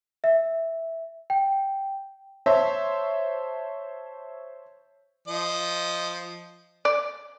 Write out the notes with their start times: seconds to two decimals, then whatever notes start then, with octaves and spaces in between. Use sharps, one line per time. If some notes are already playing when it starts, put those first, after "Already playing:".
0.24 E5
1.30 G5
2.46 C5 C#5 E5 A5
5.28 F3 D#5
6.85 D5